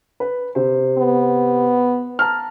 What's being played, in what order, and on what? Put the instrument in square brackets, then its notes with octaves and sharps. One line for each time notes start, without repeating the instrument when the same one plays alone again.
[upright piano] B4
C3 C5
[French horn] B3
[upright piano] A5 A#5 F6